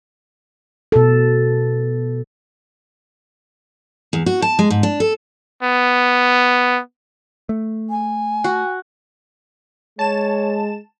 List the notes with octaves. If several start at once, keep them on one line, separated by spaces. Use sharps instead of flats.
B2 A4
E2
F#4
A5
G#3
G#2
D4
A4
B3
A3
G#5
F#4
G#3 C#5 A5 E7